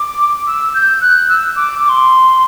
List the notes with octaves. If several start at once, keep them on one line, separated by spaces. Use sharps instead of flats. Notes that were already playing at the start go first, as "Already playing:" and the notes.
Already playing: D6
E6
G6
F#6
E6
D6
D6
C6